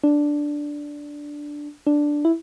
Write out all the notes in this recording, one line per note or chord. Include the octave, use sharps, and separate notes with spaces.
D4
D4
E4